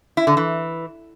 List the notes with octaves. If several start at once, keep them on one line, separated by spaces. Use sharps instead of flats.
E4
D3
E3